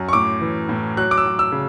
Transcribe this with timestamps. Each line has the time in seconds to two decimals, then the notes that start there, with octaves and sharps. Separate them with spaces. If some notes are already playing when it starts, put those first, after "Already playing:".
Already playing: F#2
0.09 C#6
0.13 A2 D6
0.41 E3
0.69 A2
0.97 F#3 F#6
1.11 D6
1.17 E6
1.25 F#3
1.39 E6
1.52 C#3